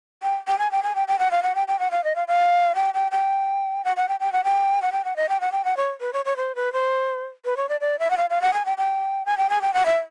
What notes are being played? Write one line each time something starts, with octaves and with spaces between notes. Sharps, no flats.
G5
G5
G#5
G5
G#5
G5
G5
F#5
F5
F#5
G5
G5
F#5
F5
D#5
F5
F5
G5
G5
G5
F#5
F#5
G5
G5
F#5
G5
F#5
G5
F#5
D#5
G5
F#5
G5
F#5
C#5
B4
C#5
C#5
C5
B4
C5
B4
C#5
D5
D5
E5
F#5
F5
F5
F#5
G#5
G5
G5
G#5
G5
G#5
G5
F#5
E5